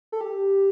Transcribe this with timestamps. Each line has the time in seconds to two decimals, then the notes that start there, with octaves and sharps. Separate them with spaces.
0.12 A4
0.21 G4